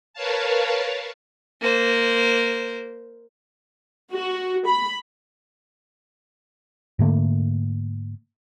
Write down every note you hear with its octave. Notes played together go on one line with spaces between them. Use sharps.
A#4 B4 C#5 F5 A5
A#3 C5
F#4
B5
G#2 D3 A3 A#3